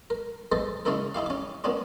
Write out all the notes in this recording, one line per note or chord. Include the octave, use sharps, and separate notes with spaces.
A#4
G#4 A4 B4 C5 D#5
C#3 G#3 C#4 D#4 E4 A#4
D#4 E4 G4 F5
C#4 D6
A#3 B3 C#4 D4 F4